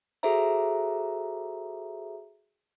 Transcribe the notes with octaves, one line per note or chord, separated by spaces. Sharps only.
F#4 G#4 A4 C5 E5 A#5